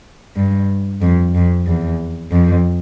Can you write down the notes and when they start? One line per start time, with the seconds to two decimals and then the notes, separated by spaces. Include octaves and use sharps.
0.36 G2
1.01 F2
1.34 F2
1.67 E2
2.31 F2